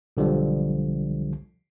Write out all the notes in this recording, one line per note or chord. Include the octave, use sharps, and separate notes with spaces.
B1 D3 F3 G3